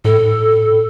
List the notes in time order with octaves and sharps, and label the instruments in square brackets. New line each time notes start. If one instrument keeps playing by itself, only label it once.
[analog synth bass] A2 [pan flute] A4